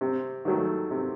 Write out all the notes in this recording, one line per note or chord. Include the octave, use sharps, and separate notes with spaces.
C3
D#3 F#3 A3
C3